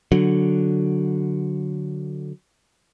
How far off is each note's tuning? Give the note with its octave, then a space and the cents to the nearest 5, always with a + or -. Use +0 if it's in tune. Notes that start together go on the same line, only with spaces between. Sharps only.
D3 +0 F#3 +0